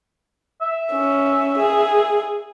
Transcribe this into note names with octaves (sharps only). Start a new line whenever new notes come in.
E5
C#4
G#4